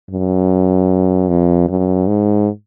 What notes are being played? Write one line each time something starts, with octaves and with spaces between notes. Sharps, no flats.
F#2
F2
F#2
G#2